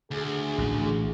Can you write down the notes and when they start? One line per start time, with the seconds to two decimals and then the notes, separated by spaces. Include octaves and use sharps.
0.11 D2 G#4
0.58 A1